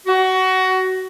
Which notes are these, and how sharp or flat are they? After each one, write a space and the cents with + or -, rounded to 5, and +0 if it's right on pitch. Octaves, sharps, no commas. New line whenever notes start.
F#4 +20